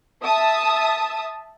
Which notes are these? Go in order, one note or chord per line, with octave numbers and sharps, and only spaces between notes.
E5 A5 D#6